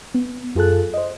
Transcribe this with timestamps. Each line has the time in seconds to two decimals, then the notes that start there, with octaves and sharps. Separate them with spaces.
0.14 B3
0.55 F#2 F4 G#4 A4 A5 F#6
0.94 C5 D#5